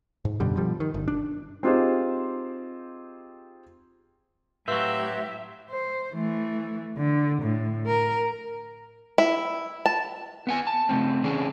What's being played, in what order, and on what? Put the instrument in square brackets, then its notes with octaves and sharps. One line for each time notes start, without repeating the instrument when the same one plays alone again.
[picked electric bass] G#2
F#2 B2 D3 G3
B2 F3 G3
D#3
G1
D4
[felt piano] C4 D#4 F4 G4 G#4 C5
[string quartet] A2 G4 [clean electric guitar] F#3 C4 [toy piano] B4 F5 C#6 [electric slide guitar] E5
[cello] C5
E3 A3
D3
A2
A#4
[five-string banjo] E4
A5
[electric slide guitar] B3 F#5 G#5
A5
C#3 A3 C4
E3 C#4 D4 G#4